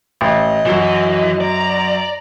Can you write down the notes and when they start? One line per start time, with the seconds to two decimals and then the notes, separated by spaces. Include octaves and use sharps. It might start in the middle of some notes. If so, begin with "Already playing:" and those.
0.21 A1 D#5
0.66 F#2 E3 F#3
1.41 D5 A#5